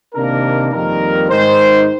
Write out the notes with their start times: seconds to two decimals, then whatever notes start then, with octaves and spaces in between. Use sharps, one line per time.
0.14 C3 D#3 A#3 D4 A#4
0.72 F2 D#3 G3 A#3 A#4
1.30 G#2 D#3 G#3 D#4 C5